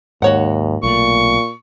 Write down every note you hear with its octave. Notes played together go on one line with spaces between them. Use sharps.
D#2 G#2 F#4 C#5 F#5
B1 A#2 A3 C#6